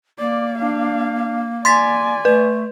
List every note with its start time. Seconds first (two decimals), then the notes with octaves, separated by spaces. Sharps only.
0.19 A#3 D5
0.58 D4 F5
1.65 D5 G#5 C6 A6 B6
2.25 A3 B4